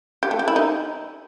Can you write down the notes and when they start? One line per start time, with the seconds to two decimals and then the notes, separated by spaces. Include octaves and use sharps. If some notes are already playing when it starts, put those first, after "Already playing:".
0.23 G4
0.31 A3
0.39 G4
0.48 E4
0.56 D#4